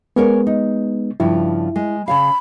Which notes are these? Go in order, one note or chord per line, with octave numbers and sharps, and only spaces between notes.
G#3 B3 C#4 A#4 C#5
D#4
G2 C#3 F3 E4
G#3
C#3 C#5 F5 B5